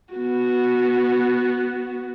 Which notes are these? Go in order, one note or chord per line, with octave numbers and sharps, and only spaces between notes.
B3 F#4